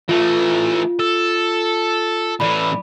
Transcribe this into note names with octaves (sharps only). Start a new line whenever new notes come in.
E3 A3 F4
A4
A2 E3 D5 B5